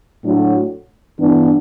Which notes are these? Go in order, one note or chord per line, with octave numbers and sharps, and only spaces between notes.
A2 F#3 A3 D4 F#4
G2 E3 B3 D4